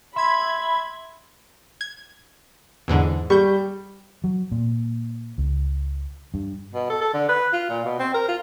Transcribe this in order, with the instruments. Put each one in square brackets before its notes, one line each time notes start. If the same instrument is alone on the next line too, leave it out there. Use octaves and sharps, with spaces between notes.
[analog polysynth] E5 G#6 [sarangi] B5 [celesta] C6
[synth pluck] G#6
E2 G#2 D3
[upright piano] G3 [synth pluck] C#6 G6
[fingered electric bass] F#3
A#2
C#2
G2
[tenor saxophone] B2
A4
A4
D3
B4
F4
A#2
B2
C4
A#4
F4